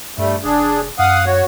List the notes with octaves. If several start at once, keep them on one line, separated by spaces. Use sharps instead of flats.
G2 G3 A3
F1 D4 G#4
F#2 F5 F#5 D#6
F#4 C#5